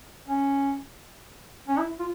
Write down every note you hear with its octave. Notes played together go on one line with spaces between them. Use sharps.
C#4
C#4
E4
F4